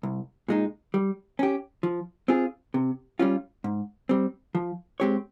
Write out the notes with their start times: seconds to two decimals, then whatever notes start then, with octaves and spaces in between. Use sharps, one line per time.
0.03 C2
0.48 A#2 G#3 D#4
0.94 G3
1.39 C#4 G4
1.83 F3
2.28 C4 F4 G#4
2.74 C3
3.19 G3 C#4 F4
3.64 G#2
4.09 G3 C4
4.55 F3
5.00 G#3 C4 G4 C#5